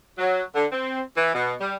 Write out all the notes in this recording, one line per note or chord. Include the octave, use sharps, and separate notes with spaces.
F#3
D3
C4
E3
B2
G3